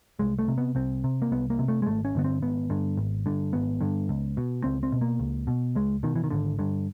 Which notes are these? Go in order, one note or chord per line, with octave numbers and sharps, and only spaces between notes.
C2 G#3
A3
C3
B3
C2 C4
C3
A#3
C2 B3
A#3
C3
A3
G#3
G#1 A3
C#4
G2 D3 B3
C4
G#1 B3
G2 D3
G#1
G2 D3
G#1 B3
G2 D3
C#2
B2
C#2 C4
C4
B2
A#3
C#2
B2
C#2 G#3
B2 D#3
E3
D#3
G#1 D3
G2 D3